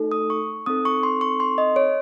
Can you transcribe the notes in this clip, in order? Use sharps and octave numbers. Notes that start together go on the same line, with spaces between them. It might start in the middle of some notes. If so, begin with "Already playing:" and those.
Already playing: A3 D#4 F#4 A4
D#6
C#6
C4 D#4 A4 D#6
C#6
C6
C#6
C6
D#5
C#5